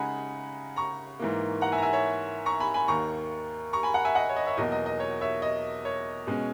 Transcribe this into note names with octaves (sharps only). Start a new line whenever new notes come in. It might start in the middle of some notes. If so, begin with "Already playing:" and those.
Already playing: C#3 G#3 D#4 F#5 G#5 A#5 B5
A#5 C#6
G#2 E3 A#3
F#5 A#5
E5 G#5
A#5
E5 G#5
C#5 E5
A#5 C#6
G#5 B5
G#5 B5
D#2 D#3 A#3 A#5 C#6
A#5 C#6
G#5 B5
F#5 A#5
E5 G#5
D#5 F#5
C#5
D#5
C#5 E5
E2 B2 F#3 A#3 D#5
D#5
D#5
C#5
C#5 E5
D#5
C#5
B2 G#3 C#4